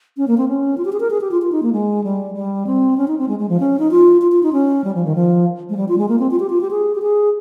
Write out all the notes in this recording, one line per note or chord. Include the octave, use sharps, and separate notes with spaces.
C#4
A#3
C4
C#4
F4
G4
G#4
A#4
G#4
G4
F4
F4
D#4
A#3
G#3
G3
G3
C4
C#4
D#4
C4
G#3
G#3
F3
C#4
D#4
F4
F4
F4
D#4
C#4
G3
F3
D#3
F3
G#3
G3
F4
G#3
A#3
C4
F4
G4
F4
G4
G#4
G4
G#4